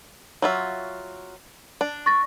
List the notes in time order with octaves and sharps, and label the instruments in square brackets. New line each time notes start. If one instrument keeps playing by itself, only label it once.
[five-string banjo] F#3 F4 E5
D4
[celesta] C#6 A6 A#6